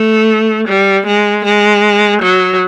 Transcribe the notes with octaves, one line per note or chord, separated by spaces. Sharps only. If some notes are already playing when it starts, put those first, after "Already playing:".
Already playing: A3
G3
G#3
G#3
F#3